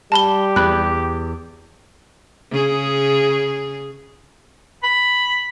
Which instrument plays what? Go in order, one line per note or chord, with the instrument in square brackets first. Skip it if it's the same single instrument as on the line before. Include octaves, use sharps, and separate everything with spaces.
[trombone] G3 [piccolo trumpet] G4 [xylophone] A5 B5 G7
[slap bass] E2 [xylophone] B5 F#6
[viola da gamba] C#3 G#4
[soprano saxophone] B5